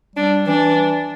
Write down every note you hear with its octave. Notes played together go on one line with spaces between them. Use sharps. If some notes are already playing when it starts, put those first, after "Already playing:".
G3 D4
E3 D4